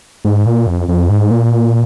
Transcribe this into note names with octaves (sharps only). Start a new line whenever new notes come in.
G#2
A#2
F2
F2
G#2
A#2